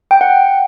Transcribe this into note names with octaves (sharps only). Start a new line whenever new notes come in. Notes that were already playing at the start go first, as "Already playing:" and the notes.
G5
F#5